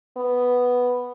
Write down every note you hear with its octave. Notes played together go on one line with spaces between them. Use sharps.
B3